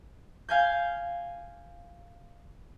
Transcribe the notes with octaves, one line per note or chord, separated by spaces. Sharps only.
F5 G#5 G6